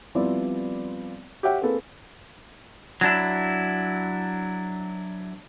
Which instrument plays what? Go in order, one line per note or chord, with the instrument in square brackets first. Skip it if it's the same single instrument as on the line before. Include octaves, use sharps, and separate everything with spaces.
[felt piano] F3 G3 B3 C4 E4 D5
G4 C#5 E5 F#5 G5
A#3 C4 G#4 A4 B4
[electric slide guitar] F#3 D4 E4